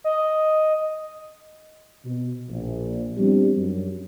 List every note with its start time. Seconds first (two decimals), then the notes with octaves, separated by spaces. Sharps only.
0.04 D#5
2.05 B2
2.49 A#1
3.17 F3 G3 B3 C4 D4 G4
3.57 F#2